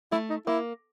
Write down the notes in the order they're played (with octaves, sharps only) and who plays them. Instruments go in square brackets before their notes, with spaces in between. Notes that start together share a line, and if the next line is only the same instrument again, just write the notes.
[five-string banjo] A3 [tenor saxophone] E4
[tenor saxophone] D#4
[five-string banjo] A#3 [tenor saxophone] E4